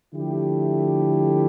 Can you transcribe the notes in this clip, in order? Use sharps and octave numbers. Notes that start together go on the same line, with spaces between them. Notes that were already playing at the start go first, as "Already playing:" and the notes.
D3 F3 A3 E4 G4